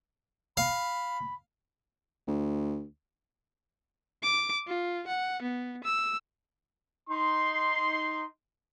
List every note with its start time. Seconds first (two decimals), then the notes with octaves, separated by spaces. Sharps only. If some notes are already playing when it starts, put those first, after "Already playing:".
0.57 F5 B5
2.28 D2
4.23 D6
4.67 F4
5.07 F#5
5.42 B3
5.84 E6
7.10 D#4 C6